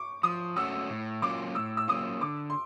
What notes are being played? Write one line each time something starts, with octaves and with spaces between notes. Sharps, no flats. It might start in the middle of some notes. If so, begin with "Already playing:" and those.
Already playing: C#6 D6
F3 D#6
A3 C#4 F#4 E6
A2
F#3 A#3 C#4 F4 D6
A2 E6
E6
F#3 A#3 C#4 F4 D#6
D3 D6
C6